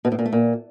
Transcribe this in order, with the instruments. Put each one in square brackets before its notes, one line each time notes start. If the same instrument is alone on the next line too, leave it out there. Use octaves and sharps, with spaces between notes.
[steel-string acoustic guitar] B2
A2
A#2
A3
A#2